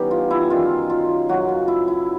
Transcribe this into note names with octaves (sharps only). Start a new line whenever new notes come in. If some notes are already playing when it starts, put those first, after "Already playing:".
Already playing: E3 G3 B3 C#4 D#4 G4
F4
E4
F#2 D#3 G3 F4
F4
F#2 C#3 F#3 F#4
F4
E4
E4